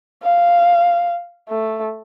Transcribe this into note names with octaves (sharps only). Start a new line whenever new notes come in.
F5
A3